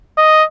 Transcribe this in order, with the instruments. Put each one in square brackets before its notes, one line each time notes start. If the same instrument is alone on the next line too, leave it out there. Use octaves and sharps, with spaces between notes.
[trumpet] D#5